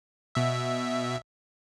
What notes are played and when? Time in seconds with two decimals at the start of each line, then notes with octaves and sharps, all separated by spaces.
0.35 B2 E5